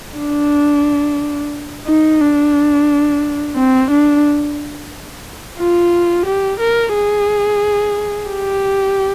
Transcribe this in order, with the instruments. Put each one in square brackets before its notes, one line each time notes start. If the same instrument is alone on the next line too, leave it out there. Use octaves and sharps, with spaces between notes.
[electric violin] D4
D#4
D4
C4
D4
F4
G4
A#4
G#4
G4